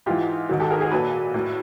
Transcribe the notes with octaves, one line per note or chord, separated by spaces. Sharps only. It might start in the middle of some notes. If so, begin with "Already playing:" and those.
G#2 E3 F4 G4
G#2 D#3 F#3
G4 A4
G#4 A#4
G#4 A#4
A#2 F#3 A4 B4
A2 F#3